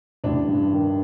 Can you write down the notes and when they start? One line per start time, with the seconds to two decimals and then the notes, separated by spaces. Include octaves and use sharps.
0.24 A1 D4
0.48 G2
0.73 D#3